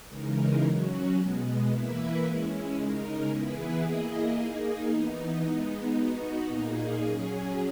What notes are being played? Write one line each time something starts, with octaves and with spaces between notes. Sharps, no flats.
C#3 E3 G#3 D#4 A#4
F#3 C#4 F#4
B2 G#3 B3
E3 A#3 E4 B4 E5
G#3 C#4 E4
C#3 G#3 D#4 A#4
E3 B3 E4 G#4 B4
A#3 E4 G#4 D#5
A#3 D#4 G#4
E3 B3 D#4
G#3 B3 D#4
B3 D#4 F#4
A#2 A#3 D#4 G#4
F#3 C#4 G#4